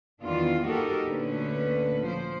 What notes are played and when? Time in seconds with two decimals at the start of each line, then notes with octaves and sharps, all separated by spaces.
0.22 E2 D#3 E3 D4 F4
0.65 A#3 D#4 F#4 G4 A4 A#4
1.06 D2 A#2 D3 A3 C#4 B4
2.03 F3 C5